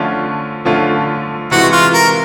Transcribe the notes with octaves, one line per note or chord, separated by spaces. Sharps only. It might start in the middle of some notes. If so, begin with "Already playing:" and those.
Already playing: D3 F3 A3 C#4 F4
D3 F3 A3 C#4 F4
C3 E3 G#3 F#4
F4
A#4